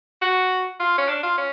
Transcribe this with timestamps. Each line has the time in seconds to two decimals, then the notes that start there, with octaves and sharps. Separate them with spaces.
0.22 F#4
0.80 F4
0.98 C#4
1.08 D4
1.23 F4
1.38 C#4